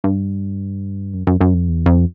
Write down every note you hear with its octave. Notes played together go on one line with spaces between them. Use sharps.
G2
F#2
F#2
F#2
F2
E2
F2